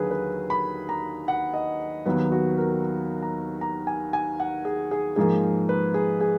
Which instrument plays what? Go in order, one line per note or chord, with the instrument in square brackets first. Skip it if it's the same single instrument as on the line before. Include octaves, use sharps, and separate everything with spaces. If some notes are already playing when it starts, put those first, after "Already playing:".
Already playing: [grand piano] D#2 D3 F#3 G#4 B4
B4
B5
A#5
F#5
D#5
D#2 D#3 F#3 B3 B4
F#4
A#4
A#5
A#5
G#5
G#5
F#5
G#4
G#4
G#2 F3 A#3 G#4
B4
G#4
G#4